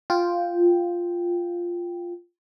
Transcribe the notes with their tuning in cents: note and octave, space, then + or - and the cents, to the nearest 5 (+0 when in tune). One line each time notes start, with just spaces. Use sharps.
F4 +0 G5 +0